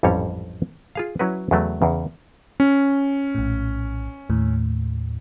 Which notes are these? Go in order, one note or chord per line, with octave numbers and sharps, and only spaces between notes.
A1 F2 G#2 G3 C#4 C#5
F4 G#4 F5
F#3 C#4 E4 F#4 B4
E2 C#3 F#3 A3
E2 C#3
C#4
A#1 A2
D#2 A2